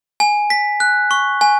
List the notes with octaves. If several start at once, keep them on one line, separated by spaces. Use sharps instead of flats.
G#5
B6
F#6
C#6
G#5